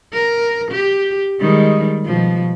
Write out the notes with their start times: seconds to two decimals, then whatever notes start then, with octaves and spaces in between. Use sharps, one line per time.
0.13 A#4
0.71 G4
1.40 D#3 G3 G#3
2.05 B2 F3